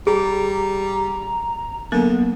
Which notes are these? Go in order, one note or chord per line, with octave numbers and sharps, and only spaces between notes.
G3 G#4 A#5
D3 F#3 A#3 B3 A#4